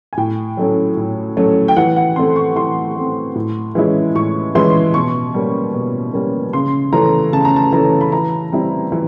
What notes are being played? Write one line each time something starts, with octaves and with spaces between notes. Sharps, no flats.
G#5
A2 G5
F#3 A3 C#4
A2
F#3 A3 C#4
G5
E3 F#5
F#5
A3 C4 C6
C#6
E3 C6
A3 C4
A2
E3 G#3 C#4 E4
A2 C#6
E3 G#3 C#4 E4 C6
B2 C#6
G3 A#3 C#4
B2
G3 A#3 C#4
C#3 C6
E3 A3 C#4 A#5
C#3 A5
A#5
A5
E3 A3 C#4 A#5
B5
E3 A#5
G3 C4 E4
E3